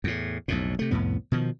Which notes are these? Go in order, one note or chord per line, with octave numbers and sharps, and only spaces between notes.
E2 A2
B1 F2 A2
C3 A3
C2 F2 A2 B3
B2 D#3 F3